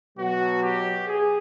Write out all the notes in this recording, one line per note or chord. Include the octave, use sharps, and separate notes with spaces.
B2 F#3 F#4
G4
G#4